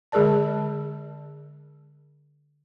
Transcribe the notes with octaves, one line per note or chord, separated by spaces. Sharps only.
D3 G#3 G#4 A#4 D5 A5